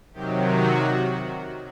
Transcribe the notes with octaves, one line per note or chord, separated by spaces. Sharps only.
C3 D#3 F#3 G4
F#4